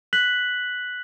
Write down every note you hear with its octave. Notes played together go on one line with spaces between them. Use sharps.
F#6 B6 F#7